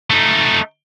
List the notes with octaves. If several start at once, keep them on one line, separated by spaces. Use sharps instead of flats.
A3 D#4